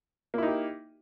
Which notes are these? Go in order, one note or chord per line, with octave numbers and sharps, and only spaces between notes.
A#3 D#4 E4 G4